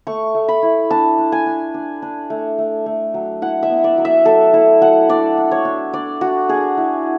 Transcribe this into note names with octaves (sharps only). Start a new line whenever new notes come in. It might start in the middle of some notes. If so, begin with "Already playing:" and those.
A3 C#6
A3
B5
E4
D4 A5
D4
G#5
D4
D4
D4
A3
A3
A3
F#3
E4 F#5
E5
B3
D5
F#3
E5
F#3 A4
E4 A4
F#3 F#5
D4 D5
D4
C#5
D4
D4 D5
D4 F#4
D4 G#4
E4